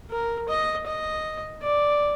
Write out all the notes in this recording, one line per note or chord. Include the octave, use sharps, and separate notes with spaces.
A#4
D#5
D#5
D5